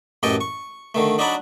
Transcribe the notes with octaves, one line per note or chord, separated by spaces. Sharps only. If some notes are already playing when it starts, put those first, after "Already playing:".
A1 F#2 G4 A4 D#5 G5
C#6
D3 D#3 A3
F#3 D4 D#4 F#4 D5 B5